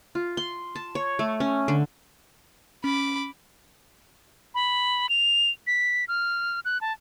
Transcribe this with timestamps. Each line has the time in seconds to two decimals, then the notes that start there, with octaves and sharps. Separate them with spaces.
0.15 F4
0.37 C6
0.75 A5
0.95 C#5
1.19 A3
1.40 C#4
1.68 D3
2.84 C#4 B5 D6
4.55 B5
5.09 F7
5.67 B6
6.08 F6
6.65 F#6
6.81 A5